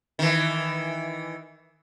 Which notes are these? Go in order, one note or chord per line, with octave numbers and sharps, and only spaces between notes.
D#3 E3